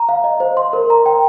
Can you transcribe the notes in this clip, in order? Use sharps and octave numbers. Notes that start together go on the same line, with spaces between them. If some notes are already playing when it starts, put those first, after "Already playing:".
Already playing: A#5
F5
D#5
C5
C6
A#4
A#5
G5